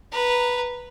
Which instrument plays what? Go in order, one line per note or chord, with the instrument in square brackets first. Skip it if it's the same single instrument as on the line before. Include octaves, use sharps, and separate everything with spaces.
[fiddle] B4 A#5